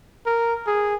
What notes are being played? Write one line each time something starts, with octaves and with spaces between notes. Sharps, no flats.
A#4
G#4